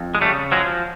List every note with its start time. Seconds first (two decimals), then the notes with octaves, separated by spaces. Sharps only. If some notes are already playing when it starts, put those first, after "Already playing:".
Already playing: F2
0.15 G#3
0.21 C#3 G3 A3
0.51 F3 F#3 G#3